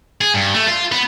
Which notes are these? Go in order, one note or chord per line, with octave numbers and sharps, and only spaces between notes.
G#4
G2
A3
F4
B3